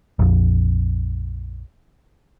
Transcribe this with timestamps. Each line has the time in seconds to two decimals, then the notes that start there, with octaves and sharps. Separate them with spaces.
0.19 A#1 F2